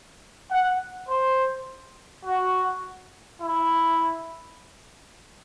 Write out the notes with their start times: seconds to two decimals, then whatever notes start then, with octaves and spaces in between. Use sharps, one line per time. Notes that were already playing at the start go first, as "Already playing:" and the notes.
0.51 F#5
1.09 C5
2.25 F#4
3.42 E4